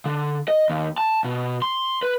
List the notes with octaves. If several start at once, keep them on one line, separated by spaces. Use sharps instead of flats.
D3
D#5
D#2
A5
B2
C6
B4